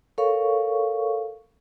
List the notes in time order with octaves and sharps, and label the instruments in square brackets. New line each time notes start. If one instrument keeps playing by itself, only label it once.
[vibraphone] A4 A#4 C#5 F5 C#6